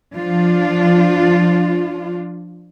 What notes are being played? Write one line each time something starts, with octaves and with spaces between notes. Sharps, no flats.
F3 D4 F4